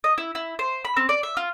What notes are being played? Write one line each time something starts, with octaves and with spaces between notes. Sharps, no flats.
D#5
E4
E4
C5
B5
C4
D5
E5
F4